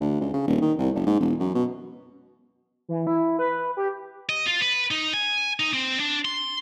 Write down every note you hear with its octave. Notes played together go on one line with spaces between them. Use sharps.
D2
C#2
C#3
D#1
D#3
C2
F#1
G#2
E1
F#2
B2
E3
E4
B4
G4
D#5
F4
B4
D#4
G#5
D#4
C4
D4
C6